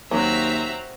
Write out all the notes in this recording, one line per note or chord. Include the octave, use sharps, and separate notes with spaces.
D#2 F#3 C4 F#4 E5 A#5